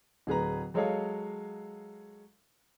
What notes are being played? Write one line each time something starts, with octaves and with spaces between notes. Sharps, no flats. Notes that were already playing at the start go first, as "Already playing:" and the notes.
D1 G#4 B4 A#5
F#3 G#3 A4 C#5 D#5 F5